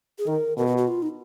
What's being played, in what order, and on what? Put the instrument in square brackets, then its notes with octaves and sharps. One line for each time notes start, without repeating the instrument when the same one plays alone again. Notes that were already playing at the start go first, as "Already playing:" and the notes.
[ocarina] G#4
[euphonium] D#3 [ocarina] A#4
[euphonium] B2 [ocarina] A#4
[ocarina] F#4
F#4
F4
D#4